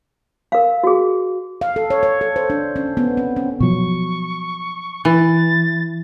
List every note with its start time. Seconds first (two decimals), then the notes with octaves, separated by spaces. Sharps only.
0.52 A#4 F5
0.83 F#4 G#4
1.61 F5
1.76 A4
1.90 C#5
2.03 C#5
2.21 A4
2.36 C5
2.50 D4
2.76 C#4
2.97 B3
3.17 C4
3.36 C#4
3.60 B2 F3 F#3 C#6
5.05 E3 A6